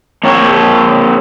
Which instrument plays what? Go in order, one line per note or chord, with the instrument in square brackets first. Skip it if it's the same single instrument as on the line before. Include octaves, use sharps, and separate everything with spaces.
[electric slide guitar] A#3 C4 C#5